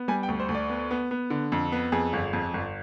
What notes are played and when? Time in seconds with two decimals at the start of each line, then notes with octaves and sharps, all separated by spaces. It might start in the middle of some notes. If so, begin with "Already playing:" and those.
Already playing: B3
0.08 G3 G#5
0.23 G5
0.28 D2
0.40 C5
0.49 D2
0.55 D5
0.70 B3
0.91 B3
1.11 B3
1.30 D3
1.52 F2
1.72 B3
1.92 F2 G#4
2.13 G1
2.33 F2
2.54 G1